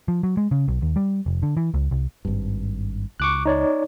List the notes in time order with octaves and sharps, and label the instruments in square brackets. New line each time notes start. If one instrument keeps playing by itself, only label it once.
[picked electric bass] F3
F#3
G#3
C#3
B1
D#2
G3
F1
D3
E3
C#2
C2
[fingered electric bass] G#1 G2
[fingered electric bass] C#2 [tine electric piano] C#6 D6 F#6
[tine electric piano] D#4 C#5 D5